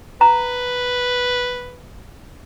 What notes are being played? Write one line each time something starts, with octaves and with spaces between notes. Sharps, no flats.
B4 A#5